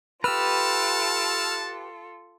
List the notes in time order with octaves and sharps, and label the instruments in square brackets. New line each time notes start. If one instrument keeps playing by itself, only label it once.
[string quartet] F4 A4 [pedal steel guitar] G4 B4 [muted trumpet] A5 [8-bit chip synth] E6 F6